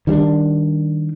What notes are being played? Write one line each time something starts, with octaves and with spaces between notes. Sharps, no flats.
D#3 G3 C#4 D4